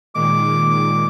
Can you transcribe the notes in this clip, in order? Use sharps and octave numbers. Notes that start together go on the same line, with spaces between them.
A#2 D#3 G#3 D6